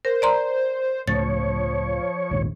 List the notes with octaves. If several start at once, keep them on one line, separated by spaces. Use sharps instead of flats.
A#4 C5
D5 A#5 C6
C#2 A2 F3 C#5 A6
A#1 D#2 G#2